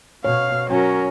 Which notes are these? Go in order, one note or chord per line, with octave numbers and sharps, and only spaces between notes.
B2 C#5 F5
F#3 C#4 A#4